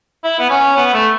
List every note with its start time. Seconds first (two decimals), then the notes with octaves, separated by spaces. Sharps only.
0.24 E4
0.39 B3
0.50 C#4
0.77 B3
0.93 A3